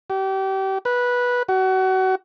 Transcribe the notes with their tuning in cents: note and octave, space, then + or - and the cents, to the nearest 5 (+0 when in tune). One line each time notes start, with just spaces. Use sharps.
G4 -30
B4 -10
F#4 +30